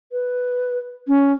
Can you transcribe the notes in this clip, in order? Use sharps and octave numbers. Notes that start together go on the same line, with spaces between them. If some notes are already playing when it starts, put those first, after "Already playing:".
B4
C#4